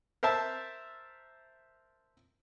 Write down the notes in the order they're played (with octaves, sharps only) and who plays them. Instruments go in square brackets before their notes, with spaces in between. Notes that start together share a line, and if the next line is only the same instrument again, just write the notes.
[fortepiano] A#4 C5 E5 A5